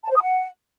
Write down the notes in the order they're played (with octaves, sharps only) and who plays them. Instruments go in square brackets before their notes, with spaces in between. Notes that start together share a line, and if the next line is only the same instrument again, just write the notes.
[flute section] A5
C5
D#6
F#5